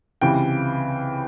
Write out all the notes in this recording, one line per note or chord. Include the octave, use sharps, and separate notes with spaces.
C#2 C3 E3 G5